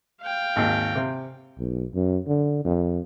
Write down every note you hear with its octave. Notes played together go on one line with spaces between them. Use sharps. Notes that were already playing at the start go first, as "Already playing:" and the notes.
F5 G5
G#1 D#2
C3
B1
F#2
D3
F2